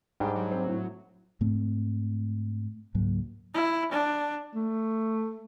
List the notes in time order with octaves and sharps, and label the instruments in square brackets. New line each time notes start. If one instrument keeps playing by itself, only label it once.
[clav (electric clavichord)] G#2 G3 D4 [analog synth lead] G#3 [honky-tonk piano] G5
[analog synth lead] F#3
[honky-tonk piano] C4
A2
[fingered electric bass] G#2 A3 C4
C#2 G#2 F#3 A#3
[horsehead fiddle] E4
D4
[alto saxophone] A3